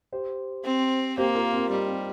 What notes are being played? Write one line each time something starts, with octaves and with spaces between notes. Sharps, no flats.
G4 C5
C4
A#3 G4 C5
F4 A#4
C4 F4
G3 D#4
C4